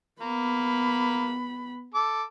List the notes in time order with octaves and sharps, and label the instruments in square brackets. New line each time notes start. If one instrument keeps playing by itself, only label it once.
[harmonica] A#3 [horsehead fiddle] B3 B5
[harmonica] A4 D6